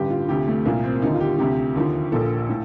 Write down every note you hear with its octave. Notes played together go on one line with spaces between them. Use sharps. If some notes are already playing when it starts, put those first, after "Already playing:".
Already playing: A1 G2 D3 G4
F4
D2 C3 F3 G4
A3
C2 A#2 F3 A#3
C4
D#2 D3 F3 D#4
F4
G4
D2 C3 F3 G4
D#2 D3 F3
A#1 A#2 F3 A4
A2